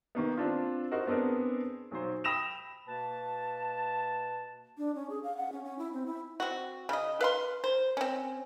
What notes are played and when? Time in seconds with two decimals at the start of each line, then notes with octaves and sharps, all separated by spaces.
0.15 D#3 A#3 B3
0.37 C4 D4 F4
0.91 D#4 F#4 A#4 C5
1.07 B3 C4 D4 G#4 A#4
1.91 B1 F#3 C5
2.24 G5 B5 D#6 A#6 E7 F7
2.87 B2 A#3 B4 A5
4.78 D4
4.95 C#4
5.10 G#4
5.24 F5
5.37 F#5
5.52 C#4
5.64 C#4
5.79 E4
5.93 C4
6.06 E4
6.40 C4 F#4
6.89 C#3 D#5
7.21 B4 F5 C6
7.64 C5
7.97 C4 C#4